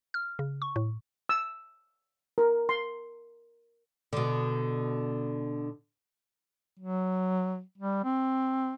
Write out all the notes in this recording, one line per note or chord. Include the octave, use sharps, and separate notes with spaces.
F6
C#3
C#6
A2
E6
A#4
C6
B2 D3
F#3
G3
C4